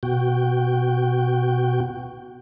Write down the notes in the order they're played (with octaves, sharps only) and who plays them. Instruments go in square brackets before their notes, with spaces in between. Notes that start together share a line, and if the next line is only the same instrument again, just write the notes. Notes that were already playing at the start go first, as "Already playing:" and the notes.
[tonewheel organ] B2 F#4 G5